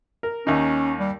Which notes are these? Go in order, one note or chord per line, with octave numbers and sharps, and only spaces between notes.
A#4
D#2 C#4 D#4
G3